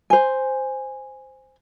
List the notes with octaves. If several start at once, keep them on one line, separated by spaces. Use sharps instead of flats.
C5 G#5